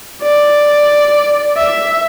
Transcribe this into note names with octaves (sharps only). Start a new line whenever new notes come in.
D5
E5